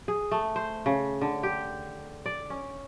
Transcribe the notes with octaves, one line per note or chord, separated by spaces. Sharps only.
G#4
A3
C5
C#3
D3
G4
D5
C#4